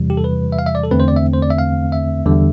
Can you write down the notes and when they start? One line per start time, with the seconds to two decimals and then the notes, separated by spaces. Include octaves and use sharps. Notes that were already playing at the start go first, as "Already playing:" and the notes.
Already playing: E2 C3 E3 G3
0.10 G4
0.17 A4
0.24 B4
0.52 E5
0.59 F5
0.66 E5
0.75 D5
0.83 A4
0.91 E2 D3 A3 C4 B4
1.00 C5
1.08 D5
1.16 E5
1.34 C5
1.42 D5
1.51 E5
1.59 F5
1.92 E5
2.25 E2 D3 G3